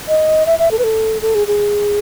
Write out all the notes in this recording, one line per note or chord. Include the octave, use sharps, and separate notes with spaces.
D#5
E5
E5
A4
B4
A4
A4
G#4
G#4